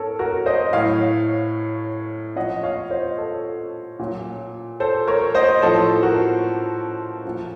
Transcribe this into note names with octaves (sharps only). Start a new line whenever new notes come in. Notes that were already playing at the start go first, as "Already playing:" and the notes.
Already playing: A2 A4 A#4 C#5
F#4 A#4
C5 D#5
A2 F#3 C#5 F5
A#2 F3 D#5 F#5
C#5 F5
C5 D#5
A4
A#2 F#3
A4 C5
A#4 C#5
C5 D#5
A2 F3 A4 C5
F#4 A#4
A#2 F3